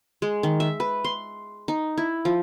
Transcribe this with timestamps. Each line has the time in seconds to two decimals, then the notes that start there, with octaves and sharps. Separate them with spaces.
0.22 G#3
0.43 D#3
0.60 E5
0.80 B4
1.04 C6
1.68 D#4
1.98 E4
2.25 F3